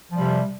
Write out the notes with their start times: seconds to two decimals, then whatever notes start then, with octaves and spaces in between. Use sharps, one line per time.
0.12 F3
0.15 G3
0.18 C3